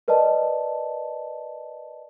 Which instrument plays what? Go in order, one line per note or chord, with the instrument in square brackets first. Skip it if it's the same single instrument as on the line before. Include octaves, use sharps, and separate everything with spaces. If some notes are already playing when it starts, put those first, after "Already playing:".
[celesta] A#4 B4 D5 D#5 A5